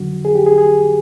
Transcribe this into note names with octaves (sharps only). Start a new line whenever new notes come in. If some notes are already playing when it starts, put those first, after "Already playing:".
Already playing: F2 D3 F#3 F#4
G#4
G4
G#4
G#4